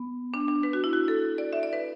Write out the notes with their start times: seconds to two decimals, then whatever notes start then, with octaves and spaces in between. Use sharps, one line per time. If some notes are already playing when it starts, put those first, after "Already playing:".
Already playing: B3
0.34 D4
0.48 D4
0.63 B4
0.73 F#4
0.84 E4
0.93 F#4
1.08 A4
1.38 D5
1.53 E5
1.63 D5
1.73 B4